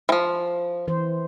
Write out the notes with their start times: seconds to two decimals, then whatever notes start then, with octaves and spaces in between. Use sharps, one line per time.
0.09 E3 F3
0.88 E3 C5